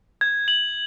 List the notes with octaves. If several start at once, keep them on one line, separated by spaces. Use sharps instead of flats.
G#6
F#7